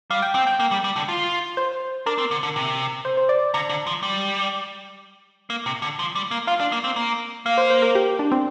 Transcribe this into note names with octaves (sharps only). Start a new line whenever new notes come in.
G3 F5
G5
C4 G5
G5
A#3
G3
G3
D3
F4
C5
D4 A#4
C4
D3
D3
C3
C5
C5
D5
D3 A#5
D3
F3
G3
A#3
C3
D3
F3
G3
A#3
F4 F5
D4
A#3
C4
A#3
A#3 F5
C5
C5
A#4
G4
D4
C4